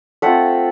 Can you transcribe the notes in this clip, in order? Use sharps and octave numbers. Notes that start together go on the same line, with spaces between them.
A3 C4 F4 E5 F#5